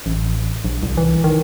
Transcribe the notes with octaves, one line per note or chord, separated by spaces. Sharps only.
A1
A#1
C2
E3
D#3